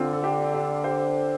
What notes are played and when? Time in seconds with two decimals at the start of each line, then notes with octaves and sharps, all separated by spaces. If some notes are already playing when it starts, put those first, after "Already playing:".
Already playing: D3 C4 F4
0.13 A4
0.24 D4 G4
0.54 D4 G4
0.84 G4 C5